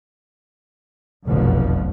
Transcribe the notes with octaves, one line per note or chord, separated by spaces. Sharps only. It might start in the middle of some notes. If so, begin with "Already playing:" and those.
F1 B1 F#2 B2 D3 F3